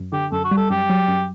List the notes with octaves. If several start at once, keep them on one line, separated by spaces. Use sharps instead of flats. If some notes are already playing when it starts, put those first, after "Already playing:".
Already playing: F#2
D3 G4
F#2 A4
F#4
G3
A4
F#2 G4
F#3
F#2